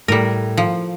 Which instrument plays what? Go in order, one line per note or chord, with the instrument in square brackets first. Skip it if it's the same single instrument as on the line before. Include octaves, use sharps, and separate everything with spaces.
[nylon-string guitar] A2 [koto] G3 A#4
[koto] F3